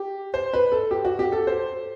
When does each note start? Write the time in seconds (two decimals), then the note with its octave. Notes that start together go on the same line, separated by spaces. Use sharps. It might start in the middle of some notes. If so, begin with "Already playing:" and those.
Already playing: G4
0.34 C5
0.53 B4
0.72 A4
0.91 G4
1.05 F#4
1.19 G4
1.32 A4
1.47 C5